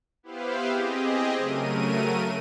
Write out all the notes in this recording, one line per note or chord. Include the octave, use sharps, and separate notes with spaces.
B3 E4 G4 B4 C5 F5
C4 G4 G#4 D#5
C#3 F#3 A3 A#4 D#7